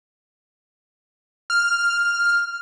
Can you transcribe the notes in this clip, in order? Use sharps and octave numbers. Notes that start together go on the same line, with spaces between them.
F6